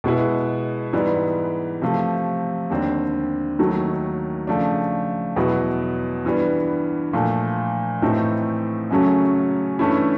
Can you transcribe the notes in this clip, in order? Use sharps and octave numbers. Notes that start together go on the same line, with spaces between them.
B2 G#3 B3 E4
G#2 E3 G3 B3
C3 F3 A3
D#2 D3 G3 C4
D#2 D#3 F#3 A3
C#3 F3 A3 D4
E2 B2 F#3 B3 E4
G2 E3 G3 B3
A#2 F3 A3
A2 E3 A3 C4 D#4
F#2 C#3 F#3 A3 C#4
G2 E3 A3 C#4 E4